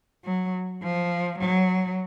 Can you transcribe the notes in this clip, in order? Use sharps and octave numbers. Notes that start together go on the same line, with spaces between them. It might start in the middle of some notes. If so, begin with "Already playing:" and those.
F#3
F3
F#3